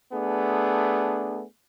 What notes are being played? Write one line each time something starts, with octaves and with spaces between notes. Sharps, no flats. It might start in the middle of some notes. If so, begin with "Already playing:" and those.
A3 B3 D4 G#4